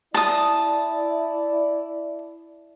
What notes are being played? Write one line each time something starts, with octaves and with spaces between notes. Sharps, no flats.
E4 D5 A5 D#6